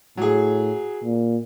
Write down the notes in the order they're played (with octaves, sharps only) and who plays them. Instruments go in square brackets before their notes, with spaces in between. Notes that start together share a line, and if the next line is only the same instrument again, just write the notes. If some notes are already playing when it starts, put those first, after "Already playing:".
[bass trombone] A2 [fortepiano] F#3 G#4
[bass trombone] A#2